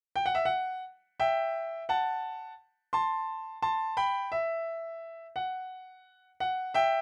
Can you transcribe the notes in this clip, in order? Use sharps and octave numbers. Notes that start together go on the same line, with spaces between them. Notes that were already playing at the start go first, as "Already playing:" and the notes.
G5
F#5
E5
F#5
E5 G5
F#5 A5
A5 C6
A5 C6
G5 B5
E5
F#5
F#5
E5 G5